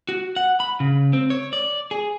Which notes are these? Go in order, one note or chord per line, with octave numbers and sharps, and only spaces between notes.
F#4
F#5
B5
C#3
C4
C#5
D5
G#4